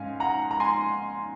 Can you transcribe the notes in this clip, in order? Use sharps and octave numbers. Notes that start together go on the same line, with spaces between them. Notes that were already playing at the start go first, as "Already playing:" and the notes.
Already playing: G#2 C#4 F5 G#5
F#5 A#5
A#5
G#5 C6